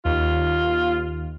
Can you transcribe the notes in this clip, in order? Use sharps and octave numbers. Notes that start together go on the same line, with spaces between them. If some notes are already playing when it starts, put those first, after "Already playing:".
D#2 F4